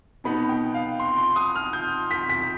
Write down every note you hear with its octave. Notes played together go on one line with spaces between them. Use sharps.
B2 B3 D#4 B5
G5
F5
C6
C6
D#6
F6
G6
B6
B6